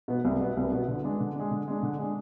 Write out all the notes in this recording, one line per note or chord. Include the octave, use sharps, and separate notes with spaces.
B2 B3
C2
B2 B3
C2
B2 B3
D3
G#3 D4
D3
G#3 D4
D3
G#3 D4
D3
G#3 D4